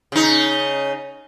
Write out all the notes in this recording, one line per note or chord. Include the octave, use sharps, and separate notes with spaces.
C#3 D#4